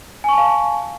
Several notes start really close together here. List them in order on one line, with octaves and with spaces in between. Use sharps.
G#5 C#6 A5 F5